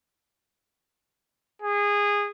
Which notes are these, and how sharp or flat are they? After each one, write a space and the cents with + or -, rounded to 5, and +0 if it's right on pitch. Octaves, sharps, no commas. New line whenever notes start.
G#4 -20